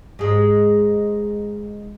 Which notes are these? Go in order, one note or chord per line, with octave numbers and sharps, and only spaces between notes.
G#2 G#3